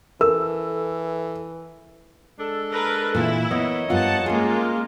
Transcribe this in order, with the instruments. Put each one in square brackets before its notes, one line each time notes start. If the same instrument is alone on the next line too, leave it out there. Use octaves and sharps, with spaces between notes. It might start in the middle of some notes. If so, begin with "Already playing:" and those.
[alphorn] E3 [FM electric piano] A4 [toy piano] A#4 [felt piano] E6
[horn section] G#3 D4 A4
[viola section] A#4 B4
[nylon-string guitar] A#2 E3 [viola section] E4
[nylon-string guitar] B3 [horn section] A#4 C#5 D#5
[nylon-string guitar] G2 B3 F4 [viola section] F#5 A5
[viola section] G#3 A#3 F4 [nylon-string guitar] C#4 G#4